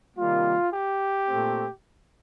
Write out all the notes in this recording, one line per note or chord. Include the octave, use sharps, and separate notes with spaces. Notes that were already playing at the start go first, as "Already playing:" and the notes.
C3 D#3 G3 A#3 F4
G4
A#2 A3 C4